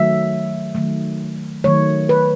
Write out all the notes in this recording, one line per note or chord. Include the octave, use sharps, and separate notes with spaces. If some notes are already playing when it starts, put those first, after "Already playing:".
Already playing: D#3 F#3 A3 E5
D#3 F#3 A3
D#3 F#3 A3 C#5
B4